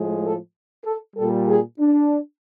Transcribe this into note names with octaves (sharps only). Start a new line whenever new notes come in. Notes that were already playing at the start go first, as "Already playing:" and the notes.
Already playing: A2 F3 G#3
A4
A4
A#2 G3 A4
G#4
D4